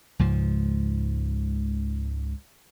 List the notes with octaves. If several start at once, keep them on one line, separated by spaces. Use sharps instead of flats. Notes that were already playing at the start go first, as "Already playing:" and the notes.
C#2 G#2 F3